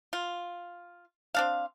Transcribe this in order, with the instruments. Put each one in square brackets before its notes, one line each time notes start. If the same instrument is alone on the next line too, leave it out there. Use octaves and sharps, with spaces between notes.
[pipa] F4
C4 D4 F5